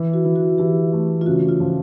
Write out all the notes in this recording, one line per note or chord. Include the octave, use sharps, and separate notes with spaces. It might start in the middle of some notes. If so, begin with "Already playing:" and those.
Already playing: E3
F#4
E3
F#4
E3 G4
A3
F4
C#3 F#4
F4
F3